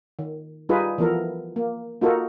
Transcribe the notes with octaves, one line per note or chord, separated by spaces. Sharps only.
D#3
G3 D#4 F4 G#4 B4
E3 F3 B3 A4 A#4
A#3
A#3 D#4 F4 F#4 A4 A#4